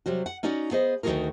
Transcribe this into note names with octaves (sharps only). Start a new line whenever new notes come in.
C3 F#3 G3 F#4
F#5
C#4 D#4 F#4 D5 F#5
B3 G#4 C5 D#5
D2 D#3 C#4 F#4 G#4 A#4